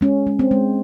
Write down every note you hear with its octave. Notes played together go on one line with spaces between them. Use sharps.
G#3 C#4
G#3
C4
G#3